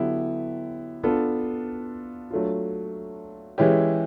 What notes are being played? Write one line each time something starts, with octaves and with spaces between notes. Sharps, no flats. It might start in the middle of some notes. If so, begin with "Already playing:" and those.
Already playing: D3 F#3 B3 E4 G4
B3 D4 F4 A4
F#3 A3 D4 F4
E3 G#3 C#4 E4 G4